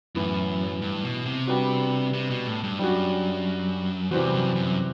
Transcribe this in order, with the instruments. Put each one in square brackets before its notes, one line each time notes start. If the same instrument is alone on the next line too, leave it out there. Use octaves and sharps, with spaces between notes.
[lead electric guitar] F#2 [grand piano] A2 E3 B3 E4
[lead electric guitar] G2
B2
C3
[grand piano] G3 B3 D4 F#4
[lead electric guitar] C3
B2
A2
G2
[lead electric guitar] F#2 [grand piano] G3 D4 F#4
[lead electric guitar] E2 [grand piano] C3 E3 G3 C4 F#4
[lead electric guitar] F#2
F#2